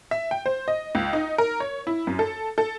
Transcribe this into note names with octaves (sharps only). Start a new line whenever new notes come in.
E5
G5
C5
D#5
C#2
D#4
A#4
C#5
E4
F#2
A4
A4